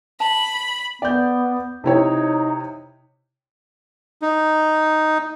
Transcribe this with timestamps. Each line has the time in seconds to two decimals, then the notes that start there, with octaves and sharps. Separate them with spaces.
0.20 A5 B5
1.02 B3 D5 G6
1.84 C3 D#4 E4 C#5
4.22 D#4